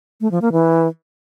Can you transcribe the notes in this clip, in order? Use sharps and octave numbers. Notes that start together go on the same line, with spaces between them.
A3
F3
A#3
E3